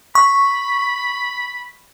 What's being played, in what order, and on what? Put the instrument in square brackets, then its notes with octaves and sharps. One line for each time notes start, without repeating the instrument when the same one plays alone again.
[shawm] B5 [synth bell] C#6